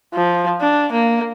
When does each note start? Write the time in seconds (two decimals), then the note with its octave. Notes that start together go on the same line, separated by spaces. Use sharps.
0.14 F3
0.61 D4
0.93 A#3